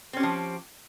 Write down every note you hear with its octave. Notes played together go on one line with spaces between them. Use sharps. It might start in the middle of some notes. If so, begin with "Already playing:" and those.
F3 C4 C#4 G4